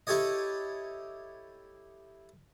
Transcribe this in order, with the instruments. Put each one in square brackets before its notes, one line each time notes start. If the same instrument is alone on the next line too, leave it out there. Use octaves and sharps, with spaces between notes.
[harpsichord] E4 G4 A4 C#5 D#5